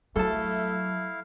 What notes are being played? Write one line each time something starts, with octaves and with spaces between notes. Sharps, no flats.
F#3 A3 E4 A4 F5 A5